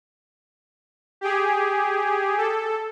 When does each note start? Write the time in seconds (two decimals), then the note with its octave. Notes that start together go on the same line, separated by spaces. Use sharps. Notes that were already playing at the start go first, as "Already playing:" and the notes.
1.21 G4 G#4
2.38 A4